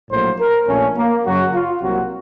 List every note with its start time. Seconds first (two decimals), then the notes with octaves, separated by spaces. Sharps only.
0.11 A#1 A2 F#3 A#3 C5
0.40 A#4
0.67 A#1 A#2 A3 C#4
0.96 A#3
1.25 F#2 C#3 F#3 F#4
1.54 F4
1.82 C2 C3 F#3 A#3 F#4